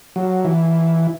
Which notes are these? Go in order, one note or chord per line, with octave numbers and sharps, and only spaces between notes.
F#3
E3